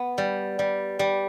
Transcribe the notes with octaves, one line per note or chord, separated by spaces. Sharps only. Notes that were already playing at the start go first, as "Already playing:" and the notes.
Already playing: B3
G3
G3
G3